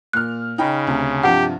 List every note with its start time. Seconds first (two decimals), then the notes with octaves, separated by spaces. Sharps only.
0.13 A#2 F6 F#6
0.58 C#3 D#4 G5 B5
0.87 D2 C3
1.23 G2 C3 F3 G4 F#5